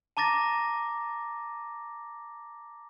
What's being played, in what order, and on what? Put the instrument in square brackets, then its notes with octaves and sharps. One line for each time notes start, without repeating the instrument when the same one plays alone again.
[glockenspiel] A5 A#5 D6 A6 A#6